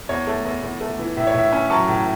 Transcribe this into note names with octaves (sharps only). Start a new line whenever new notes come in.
E2 C#5
A3
E2
E2
A3
E3
A2 E5
C#5
A2 E5
C#4
F#3 A5 C#6
A2